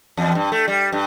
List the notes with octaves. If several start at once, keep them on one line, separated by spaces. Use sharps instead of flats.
E2
G2
A3
G3
G2